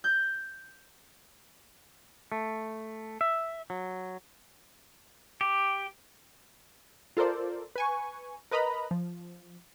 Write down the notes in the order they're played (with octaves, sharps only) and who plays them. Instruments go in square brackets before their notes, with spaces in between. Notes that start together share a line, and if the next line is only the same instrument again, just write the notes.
[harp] G6
[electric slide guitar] A3
E5
F#3
[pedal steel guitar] G4
[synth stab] F4 A4 A#4 C5 D5
B4 G#5 C#6
A#4 B4 D#5 A#5 B5
F3